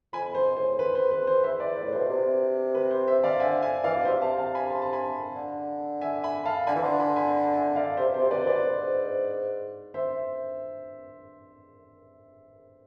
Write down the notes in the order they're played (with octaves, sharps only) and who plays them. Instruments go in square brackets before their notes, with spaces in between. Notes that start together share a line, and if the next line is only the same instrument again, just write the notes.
[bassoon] F2 [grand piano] G#5 B5
[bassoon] G#2 [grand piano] C5
[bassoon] A2 [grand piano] C5
[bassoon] E2 [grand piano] B4
[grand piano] C5
B4
C5
C5 E5
B4 D5
B4
[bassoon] A2
[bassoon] B2 [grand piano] C5
[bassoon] C3
[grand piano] B4
C5
C5 E5
D5 F5
[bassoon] D3 [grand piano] E5 G#5
[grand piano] E5 G#5
[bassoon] E3 [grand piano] D5 F5
[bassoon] B2
[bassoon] C3 [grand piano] C5 E5
[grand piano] F5 A5
F5 A5
G#5 B5
A5 C6
A5
G#5 B5
[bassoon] D3
[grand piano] E5 G#5
G#5 B5
F5 A5
[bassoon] D3 [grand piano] G#5 B5
[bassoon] E3
[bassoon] D3 [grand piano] A5 C6
[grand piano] G#5 B5
G#5 B5
A5
E5 G#5
D5 F5
[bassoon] C3 [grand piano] C5 E5
[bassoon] B2
[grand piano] C5
[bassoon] C3
[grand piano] C5
[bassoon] B2 [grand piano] B4 D5
[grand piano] C5
B4 D5
[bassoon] G#2
[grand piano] C5 E5